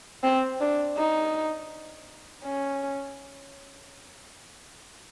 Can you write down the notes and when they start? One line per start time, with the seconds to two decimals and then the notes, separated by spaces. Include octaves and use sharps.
0.23 C4
0.60 D4
0.97 D#4
2.44 C#4